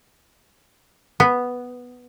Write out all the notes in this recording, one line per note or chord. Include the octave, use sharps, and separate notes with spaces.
B3